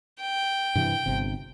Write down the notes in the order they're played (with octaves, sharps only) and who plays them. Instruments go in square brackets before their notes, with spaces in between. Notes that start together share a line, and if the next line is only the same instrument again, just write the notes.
[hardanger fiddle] G5
[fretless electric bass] G2 C3 E3
G1 C3